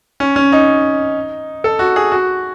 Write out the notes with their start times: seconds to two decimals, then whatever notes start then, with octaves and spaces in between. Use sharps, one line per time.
0.20 C#4
0.36 C#4
0.52 D#4
1.64 A4
1.79 F#4
1.96 G#4
2.12 F#4